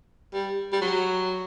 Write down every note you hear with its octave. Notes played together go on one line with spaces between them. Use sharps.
G3
G3
F#3